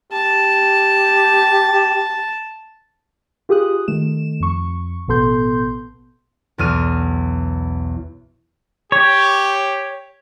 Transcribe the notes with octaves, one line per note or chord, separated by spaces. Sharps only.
G4 A5
F4 G4 G#4 D#6 F#6
D#3 A3 E7
F2 C#6
A1 B2 B3 A4 C6 G6
B1 E2 F6 D#7
G4 C#5